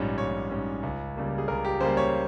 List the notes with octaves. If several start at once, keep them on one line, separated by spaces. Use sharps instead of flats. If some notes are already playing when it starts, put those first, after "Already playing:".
Already playing: A#1 G#2 G3 C#4 C#5
A#1 C#5
G#2 G3 C#4
C#2
C#3 G3 A#3
G#4
C#2 A#4
G4
C#3 G3 A#3 C5
C#5